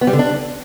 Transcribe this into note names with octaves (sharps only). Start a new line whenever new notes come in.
B3
G3
D3
D4